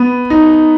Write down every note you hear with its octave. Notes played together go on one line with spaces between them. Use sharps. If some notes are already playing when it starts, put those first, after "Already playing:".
Already playing: B3
D#4